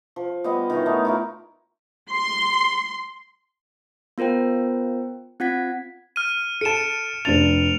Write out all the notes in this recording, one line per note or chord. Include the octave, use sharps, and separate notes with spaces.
F3
G3 B3 F4 D#5
D#3 E3 C#5
A3 B3 D#4 G4
E4 F4 A#4
C6
B3 F4 A#4 C5 G5
C4 F4 F#5 G#6 B6
F6 D#7
A4 A5 C#7 D7 E7
F1 D4 A6 F7